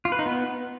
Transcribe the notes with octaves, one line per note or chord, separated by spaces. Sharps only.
F4
B4
D#4
B3